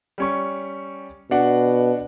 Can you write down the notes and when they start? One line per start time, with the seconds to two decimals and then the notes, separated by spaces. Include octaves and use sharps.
0.18 G3 C#4 C#6
1.31 B2 D4 F#4 F#5